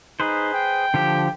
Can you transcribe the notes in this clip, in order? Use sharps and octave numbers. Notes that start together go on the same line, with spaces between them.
D#4 G#4 B4 C5
G5
D3 F3 G4